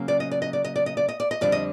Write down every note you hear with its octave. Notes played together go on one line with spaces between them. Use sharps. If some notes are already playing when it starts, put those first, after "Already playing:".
Already playing: C#3 F#3 A#3 C#4
D5
D#5
D5
D#5
D5
D#5
D5
D#5
D5
D#5
D5
D#5
F2 D3 G3 D5
D#5